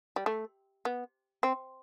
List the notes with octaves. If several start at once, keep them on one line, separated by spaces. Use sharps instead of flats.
G3
A3
B3
C4